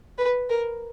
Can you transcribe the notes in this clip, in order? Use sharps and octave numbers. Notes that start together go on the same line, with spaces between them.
B4
A#4